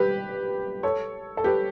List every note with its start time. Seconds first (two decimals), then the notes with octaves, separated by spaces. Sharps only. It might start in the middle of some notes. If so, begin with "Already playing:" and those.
Already playing: G4 B4
0.83 A4 C#5
1.37 A4
1.44 G4 B4